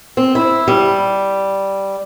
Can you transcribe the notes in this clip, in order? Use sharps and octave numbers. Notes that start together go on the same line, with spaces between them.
C4
E4
G3